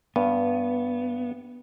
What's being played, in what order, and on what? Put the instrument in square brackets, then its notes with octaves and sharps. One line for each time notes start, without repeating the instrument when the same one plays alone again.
[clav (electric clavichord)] G2 [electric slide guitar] B3